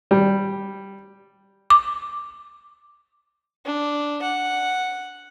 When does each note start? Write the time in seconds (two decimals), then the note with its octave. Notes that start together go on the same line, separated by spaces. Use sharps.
0.11 G3
1.70 D6
3.66 D4
4.22 F#5